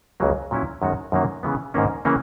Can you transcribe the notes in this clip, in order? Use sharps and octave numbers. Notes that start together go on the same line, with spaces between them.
C#2 C#3 F#3 A#3
A#2 F#3 C#4 E4
F#2 D#3 G#3 B3 F#4
F#2 D#3 F#3 A#3
C#3 E3 G#3 B3
G#2 D#3 A#3 C#4
C#3 E3 A#3 C#4